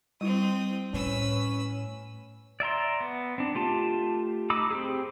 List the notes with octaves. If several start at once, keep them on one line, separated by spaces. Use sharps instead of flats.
G3 C4 E4 D#6
A2 C#4 B4 E6
D5 E5 A#5 C6
B3
C4 D4
A3 F4 G4 A5
D#4 B5 D6 E6
C4 G4 G#4